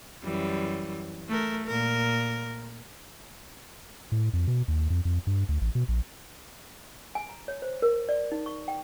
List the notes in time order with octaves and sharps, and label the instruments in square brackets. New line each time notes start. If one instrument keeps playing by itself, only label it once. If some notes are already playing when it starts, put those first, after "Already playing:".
[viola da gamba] F#2 E3 G3
A3 A#4
A#2 A#4
[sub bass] A2
F2
B2
D#2
F2
F2
G2
D2
A1
B2
A#1
[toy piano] G#5
A#5
C#5
C5
A#4
D5
D#4
C#6
G5